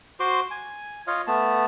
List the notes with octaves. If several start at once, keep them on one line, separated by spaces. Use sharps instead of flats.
F#4 C5 C6 D6
G#5
F4 C#5 D#5 F5
A3 B3 A5